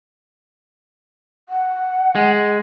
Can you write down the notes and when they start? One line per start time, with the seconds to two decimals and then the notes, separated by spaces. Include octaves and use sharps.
1.49 F#5
2.15 G#3